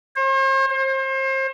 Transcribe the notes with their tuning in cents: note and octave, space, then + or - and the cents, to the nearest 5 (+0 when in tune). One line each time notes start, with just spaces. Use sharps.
C5 +45
C5 +35